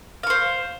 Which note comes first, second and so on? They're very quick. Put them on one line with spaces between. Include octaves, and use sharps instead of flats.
F5 C#6 C5